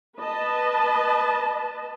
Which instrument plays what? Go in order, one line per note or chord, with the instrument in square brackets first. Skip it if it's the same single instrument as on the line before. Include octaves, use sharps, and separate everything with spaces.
[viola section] B4 D#5 A5